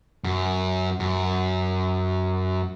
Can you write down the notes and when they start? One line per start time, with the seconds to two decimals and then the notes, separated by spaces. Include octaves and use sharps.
0.24 F#2
1.00 F#2